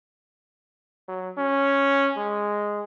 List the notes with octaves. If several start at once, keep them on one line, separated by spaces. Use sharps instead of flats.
F#3
C#4
G#3